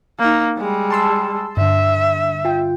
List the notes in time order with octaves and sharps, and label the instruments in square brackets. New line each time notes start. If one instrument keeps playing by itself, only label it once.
[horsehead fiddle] A#3 D#4
G3 G#3
[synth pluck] A5 C6 E6
[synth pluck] G2 D3 [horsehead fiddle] E5
[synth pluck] F4 G5